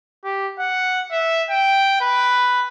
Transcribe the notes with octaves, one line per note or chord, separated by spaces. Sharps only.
G4
F#5
E5
G5
B4